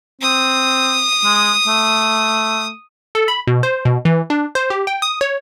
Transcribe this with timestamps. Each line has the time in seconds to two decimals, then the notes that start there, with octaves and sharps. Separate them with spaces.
0.21 C4 D#6
1.24 G#3
1.67 A3
3.15 A4
3.28 B5
3.47 B2
3.63 C5
3.85 B2
4.05 E3
4.30 D4
4.55 C5
4.70 G4
4.87 G5
5.02 D#6
5.21 C#5